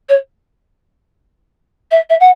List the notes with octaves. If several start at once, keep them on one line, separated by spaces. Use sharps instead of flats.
C#5
E5
E5
F#5